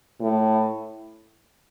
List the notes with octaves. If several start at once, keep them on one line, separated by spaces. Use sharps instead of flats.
A2